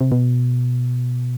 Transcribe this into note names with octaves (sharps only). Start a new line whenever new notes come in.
C3
B2